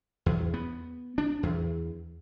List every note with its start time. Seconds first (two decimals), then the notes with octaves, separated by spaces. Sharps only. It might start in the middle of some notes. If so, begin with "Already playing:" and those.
0.26 E2
0.54 B3
1.18 D4
1.43 E2